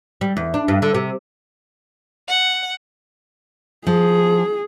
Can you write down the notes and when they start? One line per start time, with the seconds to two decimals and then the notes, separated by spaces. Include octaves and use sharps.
0.21 G3
0.37 E2
0.54 D4
0.68 G2
0.82 D3
0.95 C3
2.28 F#5
3.87 F3 G#4